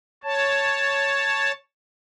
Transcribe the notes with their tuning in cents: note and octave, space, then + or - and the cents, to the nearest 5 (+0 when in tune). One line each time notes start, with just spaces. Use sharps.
C#5 +0 A5 +0